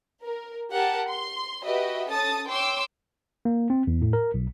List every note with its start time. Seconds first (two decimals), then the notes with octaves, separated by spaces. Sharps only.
0.23 A#4
0.74 G4 A#4 F#5 A5
1.08 C6
1.65 F#4 G4 B4 D#5 E5
2.11 C#4 A4 A5 D#6 A6
2.48 C#5 G5 C6 D6 E6
3.45 A#3
3.70 C4
3.87 E2
4.02 A2
4.13 A#4
4.34 B1